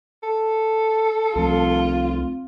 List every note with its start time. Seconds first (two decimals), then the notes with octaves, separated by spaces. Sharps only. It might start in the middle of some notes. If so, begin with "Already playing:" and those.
0.23 A4
1.35 C2 F3 A3 C4 F4